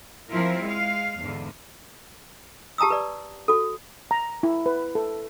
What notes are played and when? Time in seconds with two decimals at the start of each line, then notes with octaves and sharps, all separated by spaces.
0.30 F3 C4 E4 F4 A#4
0.62 G#3 F5
1.21 E2 G#2 D3
2.78 G4 A5 A#5 D#6 E6
2.90 B4 D5
3.48 F#4 A4
4.11 A#5
4.43 E4
4.66 B4
4.95 A4